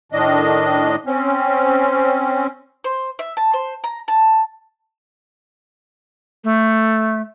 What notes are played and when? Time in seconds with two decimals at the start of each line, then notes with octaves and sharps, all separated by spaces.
0.12 A2 D#3 D4 D#5
1.06 C4 C#4
2.84 C5
3.19 E5
3.37 A5
3.53 C5
3.84 A#5
4.08 A5
6.44 A3